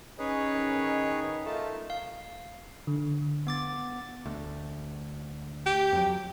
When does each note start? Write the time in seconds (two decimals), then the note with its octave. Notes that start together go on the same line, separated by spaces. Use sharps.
0.19 C#4 D#4 G#4 B4 C#5
0.52 D#3
1.46 A3 D#4 F4 A5
1.90 F5
2.87 D3
3.47 B3 D6 A6
4.26 D2
5.66 G4
5.93 F2 F#3